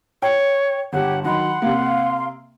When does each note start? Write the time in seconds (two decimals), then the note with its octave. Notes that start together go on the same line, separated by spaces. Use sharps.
0.22 C#5 G5
0.93 G1 G4 C#5 F#5
1.24 D#3 F#3 F#5 B5 C6
1.62 C3 A#3 F5 C6